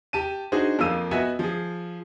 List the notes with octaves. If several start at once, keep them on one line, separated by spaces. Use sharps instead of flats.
G4 A5 D#7
D4 D#4 F#4 G#4 C5
F2 F3 A#3 F5 E6 D#7
B3 F#4 D#5 E5 F#5 G#5
F3 G#4